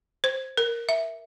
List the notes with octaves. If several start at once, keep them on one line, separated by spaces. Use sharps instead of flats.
C5
A#4
E5